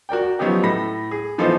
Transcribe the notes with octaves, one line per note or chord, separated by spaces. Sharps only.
F#4 A#4 D5 G5
F3 F#3 B3 C#4 D#4 G4
A2 A4 B5 A#6
G#4
E3 F3 B3 D#4 A4 C5